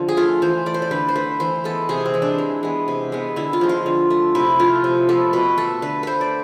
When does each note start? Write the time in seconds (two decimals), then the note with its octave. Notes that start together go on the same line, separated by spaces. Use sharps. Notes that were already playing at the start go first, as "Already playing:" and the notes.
Already playing: D3 F3
0.08 G#4
0.17 A3 F4
0.42 E3 C5
0.66 A3 D5
0.74 C5
0.82 D5
0.91 D3 B4
1.09 C5
1.16 A3 B4
1.40 E3 C5
1.64 G#3 B3 A4
1.89 C3 G#4
2.05 C4
2.14 E3 G#3
2.22 D4
2.38 E3
2.63 G#3 B3
2.88 C3
3.12 G#3 B3
3.36 D3 E4
3.53 F4
3.61 F3 G#3
3.69 F4
3.86 D3
4.10 A3
4.35 C3 E4
4.60 F3 A3 F4
4.84 C3
5.09 F3 B3 A4
5.33 B2 B4
5.58 A3 A4
5.82 D3 B4
6.03 A3 B4 C5
6.21 D5